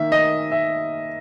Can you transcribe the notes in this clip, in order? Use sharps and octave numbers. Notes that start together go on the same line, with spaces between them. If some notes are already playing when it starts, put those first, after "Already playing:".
Already playing: D#3 A#3 E5
D#5
E5